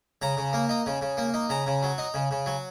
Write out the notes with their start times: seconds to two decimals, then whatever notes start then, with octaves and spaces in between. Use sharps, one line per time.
0.22 C#3 A#5
0.37 C#3
0.53 A#3
0.69 D#4
0.86 C#3
1.01 C#3
1.17 A#3
1.34 D#4
1.49 C#3 A#5
1.67 C#3
1.83 F#3
1.98 D#4
2.14 C#3
2.31 C#3
2.46 F#3